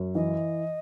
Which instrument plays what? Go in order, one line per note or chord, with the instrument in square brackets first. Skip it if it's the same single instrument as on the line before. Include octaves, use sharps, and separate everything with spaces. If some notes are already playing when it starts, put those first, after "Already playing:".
Already playing: [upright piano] F#2
[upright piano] E3 [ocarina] D#5